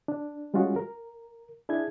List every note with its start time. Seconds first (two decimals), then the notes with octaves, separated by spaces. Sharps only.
0.08 D4
0.54 G3 G#3 C#4 F4 F#4 G#4
0.76 A#4
1.69 D4 E4 G#4 G#6